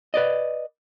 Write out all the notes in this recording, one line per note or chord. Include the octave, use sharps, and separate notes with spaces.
B4 D5 D#5